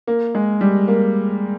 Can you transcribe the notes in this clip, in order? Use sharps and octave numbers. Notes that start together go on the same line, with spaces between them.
A#3
G#3
G3
A#3